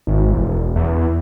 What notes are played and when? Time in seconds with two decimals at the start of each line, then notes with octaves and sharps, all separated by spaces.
0.07 G#1
0.33 E1
0.76 E2